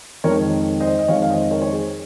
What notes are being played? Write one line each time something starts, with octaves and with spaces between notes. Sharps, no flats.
F2 D#3 G#3 A#4 C#5
C5 D#5
D#5
F2 D#3 G#3 C#5 F5
F5
C5 D#5
A#4 C#5
C#5
G#4 C5